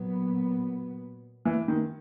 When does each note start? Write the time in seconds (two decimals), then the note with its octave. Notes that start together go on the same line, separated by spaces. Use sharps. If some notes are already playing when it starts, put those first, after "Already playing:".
Already playing: A#2 F#3 B3
1.45 E3
1.68 D#3